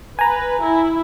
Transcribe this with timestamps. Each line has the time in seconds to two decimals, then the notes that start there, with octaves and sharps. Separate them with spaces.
0.19 B4 G#5 A#5
0.62 E4